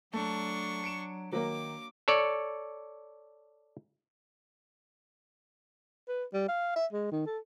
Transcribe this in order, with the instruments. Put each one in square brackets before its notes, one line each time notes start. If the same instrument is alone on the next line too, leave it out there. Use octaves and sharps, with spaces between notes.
[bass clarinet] F#3 [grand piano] A3 [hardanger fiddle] D4 C#6
[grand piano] C#7 D7 E7
[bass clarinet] D#3 [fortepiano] F#3 A#3 [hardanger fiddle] D6
[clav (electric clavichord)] A4 C#5 D5
[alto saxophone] B4
G3
F5
E5
G#3
D#3
A4